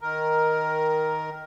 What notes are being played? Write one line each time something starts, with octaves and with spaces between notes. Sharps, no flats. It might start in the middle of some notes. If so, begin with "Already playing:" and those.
D#3 A#4